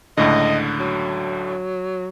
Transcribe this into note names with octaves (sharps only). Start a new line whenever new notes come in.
C#2 A2 D3 D#5
F#3